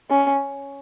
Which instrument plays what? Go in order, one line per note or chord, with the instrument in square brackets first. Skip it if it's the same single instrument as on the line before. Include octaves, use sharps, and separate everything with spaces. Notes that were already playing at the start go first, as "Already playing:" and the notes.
[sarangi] C#4